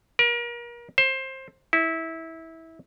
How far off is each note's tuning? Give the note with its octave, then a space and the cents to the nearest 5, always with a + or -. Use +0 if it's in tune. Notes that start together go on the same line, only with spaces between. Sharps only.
A#4 +35
C5 +20
E4 -20